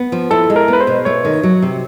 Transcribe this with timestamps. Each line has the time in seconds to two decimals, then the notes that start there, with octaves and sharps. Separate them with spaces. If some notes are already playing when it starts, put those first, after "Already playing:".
Already playing: B3
0.12 F3
0.31 E4 A4
0.50 G#3
0.56 A#4
0.68 B3
0.73 B4
0.80 C5
0.87 B2
1.05 A3 C#5
1.25 D#3
1.43 F#3
1.62 C3